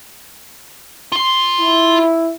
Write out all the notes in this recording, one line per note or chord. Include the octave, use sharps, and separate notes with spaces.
F4 C6
E4